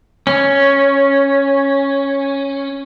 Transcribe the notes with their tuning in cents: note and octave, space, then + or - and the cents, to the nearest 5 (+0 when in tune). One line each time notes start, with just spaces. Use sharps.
C#4 -5